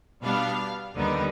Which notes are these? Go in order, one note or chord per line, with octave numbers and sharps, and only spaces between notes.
B2 G3 B3 D4 F5
D#2 D3 G3 B3 D#4